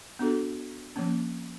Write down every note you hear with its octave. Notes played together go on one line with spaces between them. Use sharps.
B3 D4 F#4 A4
F3 A#3 C#4